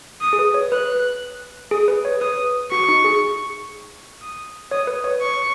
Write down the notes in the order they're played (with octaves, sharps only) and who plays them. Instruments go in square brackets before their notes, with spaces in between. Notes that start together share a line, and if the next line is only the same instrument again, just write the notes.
[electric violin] D#6
[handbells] G#4
B4
C#5
[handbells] B4 [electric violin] F#6
[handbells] G#4 [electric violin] D#6
[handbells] B4
C#5
[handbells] B4 [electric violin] D#6
[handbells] F#4 [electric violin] C#6
[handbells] D#4
G#4
[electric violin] D#6
[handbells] C#5 [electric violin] D#6
[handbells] B4
C#5
[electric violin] C#6